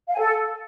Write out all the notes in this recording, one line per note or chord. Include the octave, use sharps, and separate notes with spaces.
F5
G#5
A4